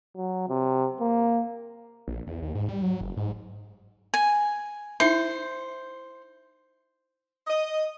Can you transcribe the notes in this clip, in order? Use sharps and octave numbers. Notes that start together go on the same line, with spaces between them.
F#3
C3
A#3
A#1
E2
D#2
G#2
G3
F#3
F#1
G#2
G#5
D#4 E4 C5 E5
D#5